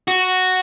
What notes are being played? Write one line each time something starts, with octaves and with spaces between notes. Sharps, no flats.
F#4